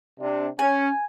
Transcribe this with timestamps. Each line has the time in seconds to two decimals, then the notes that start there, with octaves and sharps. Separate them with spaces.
0.20 C3 D4
0.59 C#4 G#5